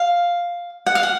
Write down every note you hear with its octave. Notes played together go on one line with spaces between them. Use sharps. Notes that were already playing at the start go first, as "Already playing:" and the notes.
Already playing: F5
F#5
F5
F#5